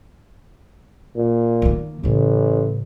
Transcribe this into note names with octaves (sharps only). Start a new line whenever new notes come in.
A#2
D#3 A#3
A1 A2 C#3